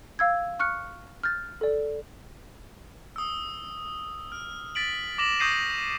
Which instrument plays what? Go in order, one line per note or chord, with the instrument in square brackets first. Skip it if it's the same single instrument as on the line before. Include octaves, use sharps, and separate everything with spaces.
[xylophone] F5 E6 G#6
C#6 F6 F#6 C#7
F6 G6 A6
A4 D5
[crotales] D#6 E6
F6
A6 B6 D7 F#7
D6 A#6 E7 F#7
C#6 D#6 G6 A#6 C7 D#7